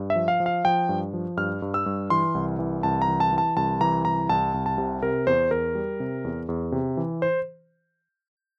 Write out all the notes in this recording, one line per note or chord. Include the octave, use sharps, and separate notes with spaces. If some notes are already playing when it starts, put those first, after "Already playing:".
Already playing: G2
E5
F3
F5
F3
F5
F3 G5
G2
F3
G2 F6
G2
E6
G2
E3 C6
C2
E3
C2 A5
A#5
E3
A5
E3
A5
C2 A5
E3 A#5
C2 A#5
C2 A5
C2
A5
C3
C3 A#4
E2 C5
E2 A#4
G3
C3
E2
E2
C3
E3
C5